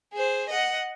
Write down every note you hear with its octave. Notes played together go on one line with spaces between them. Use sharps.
G#4 C5
D#5 F#5